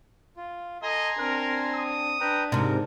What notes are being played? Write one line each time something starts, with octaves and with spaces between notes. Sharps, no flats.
F4
A4 D#5 G#5 A#5 C6
C4 D4 A#4
D#6
D4 B4 G5 A#5
G#2 C3 A#4